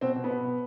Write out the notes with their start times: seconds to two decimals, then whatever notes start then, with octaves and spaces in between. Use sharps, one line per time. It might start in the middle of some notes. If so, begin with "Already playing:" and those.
0.01 B2 C4
0.16 B2
0.24 B3
0.30 B2
0.45 B2